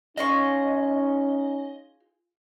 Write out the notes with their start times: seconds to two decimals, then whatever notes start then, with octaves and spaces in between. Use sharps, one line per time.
0.17 C#4 D#4 F4 G#4 D#5 C#6